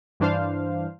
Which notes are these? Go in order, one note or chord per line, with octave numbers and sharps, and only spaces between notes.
G2 E3 D4 C5 F5